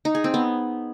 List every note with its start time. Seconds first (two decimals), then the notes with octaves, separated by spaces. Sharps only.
0.05 D#4
0.15 G#4
0.24 C4
0.34 B3